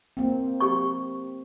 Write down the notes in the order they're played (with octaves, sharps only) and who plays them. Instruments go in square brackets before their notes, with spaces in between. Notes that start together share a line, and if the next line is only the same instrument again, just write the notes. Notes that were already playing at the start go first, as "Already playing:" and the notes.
[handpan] A#3 C4
[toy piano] G4 C#6